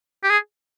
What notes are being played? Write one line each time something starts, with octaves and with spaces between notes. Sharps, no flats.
G4
G#4